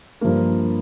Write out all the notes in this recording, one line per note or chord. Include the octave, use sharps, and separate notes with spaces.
G2 F3 A#3